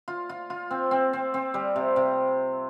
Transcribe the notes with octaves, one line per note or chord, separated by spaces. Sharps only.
F4
F4
F4
C4
C4
C4
C4
G3
C3
C3